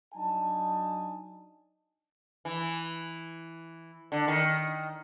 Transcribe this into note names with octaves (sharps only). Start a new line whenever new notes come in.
F#3 D4 D#4 G#5 A5
E3
D3
D#3